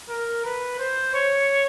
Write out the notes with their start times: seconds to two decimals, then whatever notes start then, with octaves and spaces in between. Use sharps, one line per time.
0.10 A#4
0.45 B4
0.80 C5
1.15 C#5